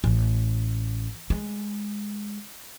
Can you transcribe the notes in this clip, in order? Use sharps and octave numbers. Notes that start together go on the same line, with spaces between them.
A1
G#3